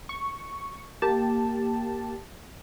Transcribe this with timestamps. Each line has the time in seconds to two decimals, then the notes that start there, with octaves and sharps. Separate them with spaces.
0.09 C#6
1.02 A#3 G4 A5